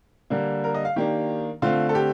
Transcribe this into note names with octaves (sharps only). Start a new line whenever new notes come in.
D3 G3 A#3
A#4
D#5
F5
D#3 A#3 D4 G4
D3 A3 C4 F4
A4
G4